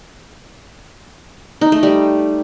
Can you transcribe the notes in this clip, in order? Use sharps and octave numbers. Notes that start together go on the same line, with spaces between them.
D#4
A3
G3